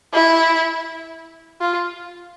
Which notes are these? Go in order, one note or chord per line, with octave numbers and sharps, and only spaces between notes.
E4
F4